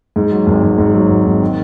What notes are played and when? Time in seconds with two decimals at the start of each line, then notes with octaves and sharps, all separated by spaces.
0.16 G#2
0.31 F#3
0.47 G#1
0.62 G#1
0.78 G#2
0.94 F#3
1.10 G#1
1.26 G#1
1.41 D#3